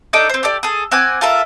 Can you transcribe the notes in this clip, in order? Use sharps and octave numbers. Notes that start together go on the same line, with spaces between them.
D4 D#4 A4 D6
C4 C5
G4 A4 D5
G#4 A4
C4 F#5 G#5 D6
F4 A4 A#4 E5